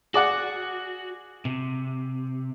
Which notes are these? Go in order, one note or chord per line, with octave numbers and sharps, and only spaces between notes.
F#4 G#4 D5 F#5
C3